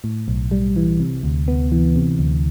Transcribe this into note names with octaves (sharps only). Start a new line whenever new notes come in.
A2
B1
G3
E3
C3
D2
B3
E3
C3
D2